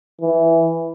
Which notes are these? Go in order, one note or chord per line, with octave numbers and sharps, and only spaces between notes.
E3